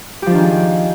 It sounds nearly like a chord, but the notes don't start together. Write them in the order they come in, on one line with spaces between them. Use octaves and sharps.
G4 F3 D4 D#3 G#4